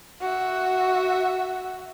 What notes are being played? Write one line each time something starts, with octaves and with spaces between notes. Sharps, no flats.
F#4 E5